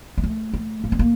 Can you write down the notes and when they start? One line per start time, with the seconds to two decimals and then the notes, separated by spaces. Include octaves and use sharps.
0.18 G3
0.23 A3
0.53 A3
0.84 A#3
0.92 C4
0.99 A#3